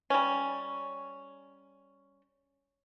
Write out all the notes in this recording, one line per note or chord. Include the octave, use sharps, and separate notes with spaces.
G3 C#4